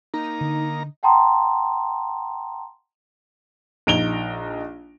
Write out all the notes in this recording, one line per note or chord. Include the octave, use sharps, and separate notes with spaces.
A#3 D#4 A#5
D3
F#5 G5 A5 A#5 C6 D#6
A#1 D#4 D7 F7 G7